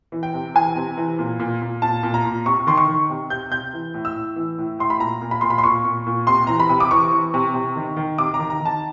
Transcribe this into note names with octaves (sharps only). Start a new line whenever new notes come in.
E3
G5
C3
E3 G#5
C3
E3
A#2
A#2
A#2
A#2 A5
A#2
A#5
A#2
C3 C#6
D#3 C6
C#6
D#3
C3
C3 G6
C3 G6
E3
A2
E6
A2
E3
A2
A2 C6
B5
A#2 A#5
A#2
B5
A#2 C6
B5
C6
A#2 C#6
A#2
A#2
C3 C6
E3 A#5
B5
C3
D6
E3 C#6
E3
C3
C3
D#3
D#3
C3 D6
A#5
D#3
A#5
D#3
A5